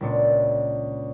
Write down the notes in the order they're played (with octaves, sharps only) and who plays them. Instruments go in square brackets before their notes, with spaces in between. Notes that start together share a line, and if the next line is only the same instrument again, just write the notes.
[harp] C#2 A#2 D4 C#7